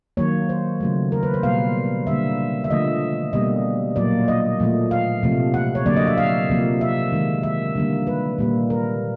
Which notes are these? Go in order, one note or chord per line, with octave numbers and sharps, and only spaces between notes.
D#3 F#3 A#3 C#5
C5
C#3 F#3 A3
A#4
B4
C5
B2 G3 A#3 F5
D3 G3 A#3 E5
E5
D3 F3 A3 D#5
B2 G3 A#3 D#5
A#2 F#3 A#3 D5
D#5
A#2 F3 A3
F5
C3 F3 A3
F#5
C#5
D3 F#3 A#3 D5
D#5
E5
F5
C3 F3 A#3
E5
D#3 G#3
E5
D3 G3 A#3
B4
A#2 G3 A#3
A#4